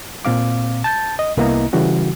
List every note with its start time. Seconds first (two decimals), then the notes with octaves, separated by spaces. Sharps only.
0.25 A#2 C4 F5 D6
0.84 A5 G6 A6
1.19 D#5
1.37 C2 A#3 B3 E4 D#5 A#5
1.73 C#3 E3 G3 F#4